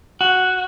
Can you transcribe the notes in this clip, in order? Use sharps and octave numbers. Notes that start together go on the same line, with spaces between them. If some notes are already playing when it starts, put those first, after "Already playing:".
F#4